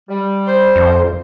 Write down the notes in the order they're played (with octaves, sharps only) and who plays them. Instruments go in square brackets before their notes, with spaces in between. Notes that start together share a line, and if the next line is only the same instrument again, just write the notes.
[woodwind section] G3
[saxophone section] C5
[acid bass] F2